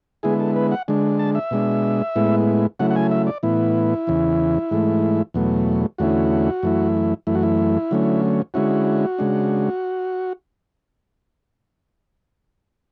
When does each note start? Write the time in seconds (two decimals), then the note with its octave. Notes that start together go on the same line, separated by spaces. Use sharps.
0.23 D3 G#3 B3 E4 G#4
0.40 A4
0.56 B4
0.71 F#5
0.88 D3 G#3 D4
1.19 A5
1.35 E5
1.51 B2 G#3 D4
2.16 A2 G#3 B3 E4
2.79 C#3 F#3 A3 E4 F#5
2.90 F#5
2.96 G#5
3.11 E5
3.27 D5
3.43 A2 E3 B3 E4
4.07 E2 C#3 E3
4.71 G#2 E3 A3
5.34 E2 B2 F#3 A3
5.98 E2 D3 A3 C#4 E4 F#4
6.63 F#2 E3 A3 E4
7.27 F#2 E3 A3 E4
7.35 F#4
7.43 E4
7.91 D3 F#3 A3 C#4
8.54 D3 G#3 C#4 E4 F#4
9.19 C#3 G#3 D4